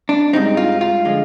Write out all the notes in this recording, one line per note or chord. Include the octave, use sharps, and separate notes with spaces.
D4
G#2 G3 C4 D#4
F4
F4
D3 F3 G#3